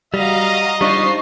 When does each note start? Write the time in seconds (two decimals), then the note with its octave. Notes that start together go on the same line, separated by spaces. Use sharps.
0.14 G3 F#4 D#5 F5 A#5
0.81 G3 D4 D#4 F4 C5 C#6 C7